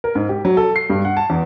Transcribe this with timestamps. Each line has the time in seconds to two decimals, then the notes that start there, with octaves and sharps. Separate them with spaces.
0.04 A#4
0.15 G#2
0.29 G4
0.45 F#3
0.57 A4
0.76 C7
0.90 G2
1.05 F#5
1.17 A5
1.30 E2